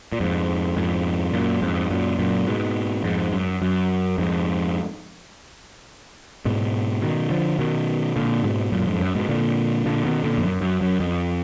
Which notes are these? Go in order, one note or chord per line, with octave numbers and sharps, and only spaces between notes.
A#2
F2 G#2
F2 G#2
F#2 A#2
F2 G#2
F#2 A#2
F#2 A#2
G#2 B2
F2 G#2
F#2
F#2
F2 G#2
G#2 B2
B2 D#3
D3 F3
B2 D#3
A#2 D3
G#2 B2
F#2 A#2
F2 G#2
F#2
G#2 B2
A#2 D3
A#2 D3
B2 D#3
A#2 D3
F2
F#2
F#2
F#2
F2